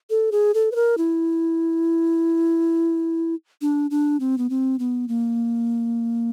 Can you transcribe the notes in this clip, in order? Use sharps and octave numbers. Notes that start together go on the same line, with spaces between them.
A4
G#4
A4
B4
A#4
E4
D4
D4
C4
B3
C4
B3
A#3